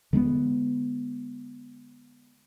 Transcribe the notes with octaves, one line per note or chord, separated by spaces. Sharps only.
D3 G#3 A#3 B3